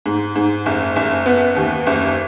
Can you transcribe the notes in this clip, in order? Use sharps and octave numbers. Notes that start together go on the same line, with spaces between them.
G#2
G#2
F#1
F#1
B3
D#2
F#1